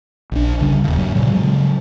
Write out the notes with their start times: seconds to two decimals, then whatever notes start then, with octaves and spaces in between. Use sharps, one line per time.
0.32 A#1 D4
0.59 D1 C#3 G3
0.84 D#1 D#2
0.97 G2 F#3
1.15 A#2 C#3 F3 G3
1.32 C#3 F#3 G#3